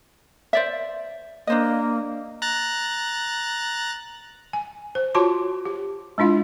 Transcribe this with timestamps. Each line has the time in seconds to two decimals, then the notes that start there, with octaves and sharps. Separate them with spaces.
0.53 C5 D5 E5
1.47 A#3 D4 C5 D#5
2.42 A#5 F#6 A6
4.53 G#5
4.95 C5
5.15 F4 F#4 C#5 A5 C6 D6
5.65 G4
6.18 G#3 D4 E4 F4 F5